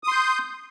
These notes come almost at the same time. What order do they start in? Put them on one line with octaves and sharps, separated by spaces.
D#6 C6 G6